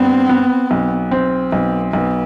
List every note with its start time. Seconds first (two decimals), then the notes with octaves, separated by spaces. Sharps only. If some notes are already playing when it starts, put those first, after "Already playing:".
Already playing: G2 B3 C4
0.29 B3
0.71 B1
1.11 C4
1.52 B1 B3
1.93 B1 B3